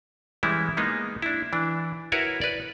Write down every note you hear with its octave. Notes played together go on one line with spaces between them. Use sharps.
E3 G3 G#3 C#4 E4
G#3 A#3 B3 D#4
D4 E4
E3 D4
E4 F#4 A#4 B4 C#5 E5
B4 D5